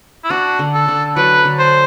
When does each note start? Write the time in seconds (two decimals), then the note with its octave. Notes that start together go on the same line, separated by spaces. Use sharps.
0.24 E4
0.30 D4 F#4
0.59 D3
0.73 A4
0.88 D3
1.16 F#3 B4
1.45 D3
1.59 C5